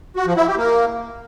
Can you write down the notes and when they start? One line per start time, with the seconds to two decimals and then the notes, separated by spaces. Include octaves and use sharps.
0.16 F#4
0.26 F3
0.37 E4
0.47 G4
0.57 A#3